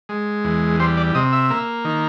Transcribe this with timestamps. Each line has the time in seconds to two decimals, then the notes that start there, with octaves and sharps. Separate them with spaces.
0.09 G#3
0.44 E2
0.80 G3 C5
0.97 D5
1.15 C3 D#5
1.32 E5
1.50 A#3
1.85 D#3